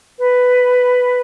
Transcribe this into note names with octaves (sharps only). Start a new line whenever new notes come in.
B4